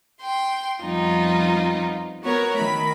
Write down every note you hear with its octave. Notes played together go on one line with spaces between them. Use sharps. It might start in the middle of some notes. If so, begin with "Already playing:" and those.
G5 C6
F2 F3 G3 B3 D#4 F4
B3 F#4 A#4 C#5
D#3 A3 B5